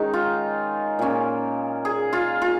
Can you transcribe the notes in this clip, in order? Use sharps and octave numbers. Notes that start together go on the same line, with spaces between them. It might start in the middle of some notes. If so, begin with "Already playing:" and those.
Already playing: D#3 G#3 C#4 D#4
F4
A#2 A#3 C#4
G#4
F4
F4